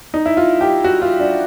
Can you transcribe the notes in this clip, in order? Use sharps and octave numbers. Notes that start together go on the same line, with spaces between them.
D#4
E4
F4
G4
F#4
F4
D4